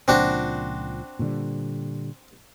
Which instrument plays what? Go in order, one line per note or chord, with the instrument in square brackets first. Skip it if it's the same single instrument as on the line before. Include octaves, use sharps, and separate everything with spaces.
[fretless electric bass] C#2 A#2 F3 [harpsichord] C4 D4 F#4
[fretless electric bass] A#2 D3 G3